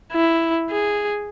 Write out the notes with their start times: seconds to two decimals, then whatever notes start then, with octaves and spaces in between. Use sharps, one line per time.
0.12 E4
0.71 G#4